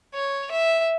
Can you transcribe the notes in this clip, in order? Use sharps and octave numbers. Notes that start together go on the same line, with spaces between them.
C#5
E5